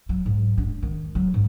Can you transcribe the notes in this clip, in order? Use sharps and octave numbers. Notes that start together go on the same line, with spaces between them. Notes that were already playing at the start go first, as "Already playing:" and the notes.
F#3
G#2
D4
D#3
F#3
G#2